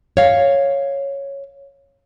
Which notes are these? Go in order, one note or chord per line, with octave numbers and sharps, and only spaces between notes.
C#5 F5